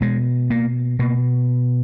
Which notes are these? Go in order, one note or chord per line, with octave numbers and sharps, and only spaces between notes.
B2 G#3
A#3
B2 A#3